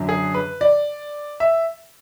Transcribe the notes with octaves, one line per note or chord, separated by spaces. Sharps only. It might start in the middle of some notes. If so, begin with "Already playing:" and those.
Already playing: F#2 D3 F#3
G#4
B4
D5
E5